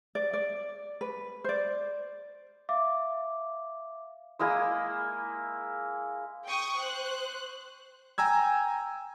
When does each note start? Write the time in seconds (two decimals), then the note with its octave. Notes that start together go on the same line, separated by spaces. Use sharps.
0.15 D5
0.33 D5
1.01 B4
1.44 C5 D5
2.69 E5 F5 D6
4.39 G#3 A#3 E4 D#6
6.46 G5 C#6 D#6
6.79 C5 F#6
8.18 G5 G#5 A#5 E6 G#6